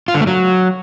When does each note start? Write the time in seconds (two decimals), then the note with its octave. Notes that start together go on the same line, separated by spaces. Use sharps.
0.08 F4
0.14 D3
0.21 A3
0.27 F#3